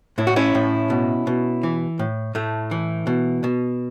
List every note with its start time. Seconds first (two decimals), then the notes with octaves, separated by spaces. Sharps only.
0.18 A2 E4
0.27 F#4
0.36 C#4 E4
0.55 A2
0.90 B2
1.27 B2
1.63 E3
1.99 A2
2.35 A2 A3
2.71 E3
3.07 B2
3.44 B2